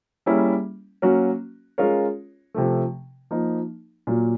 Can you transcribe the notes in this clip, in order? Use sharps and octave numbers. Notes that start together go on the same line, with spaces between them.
G3 A#3 C#4 E4 G#4
F#3 A#3 C#4 F#4
G#3 C#4 F4 A#4 C#5
C3 F3 A3
F3 A#3 D#4
A#2 F#3 A#3